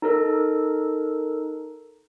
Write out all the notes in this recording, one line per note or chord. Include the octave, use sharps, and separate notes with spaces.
D#4 A4 A#4